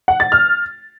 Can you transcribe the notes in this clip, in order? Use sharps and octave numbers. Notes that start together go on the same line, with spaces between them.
F#5
A6
F6